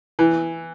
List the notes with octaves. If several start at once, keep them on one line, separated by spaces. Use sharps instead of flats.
E3